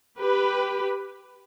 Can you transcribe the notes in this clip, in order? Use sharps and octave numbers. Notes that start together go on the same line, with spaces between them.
G4 B4